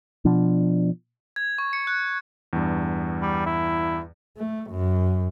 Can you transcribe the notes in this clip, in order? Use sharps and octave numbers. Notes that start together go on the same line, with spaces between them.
B2 F3 D4
G#6
C#6
C#7
F#6
E2 G2
G3
E4
A3
F#2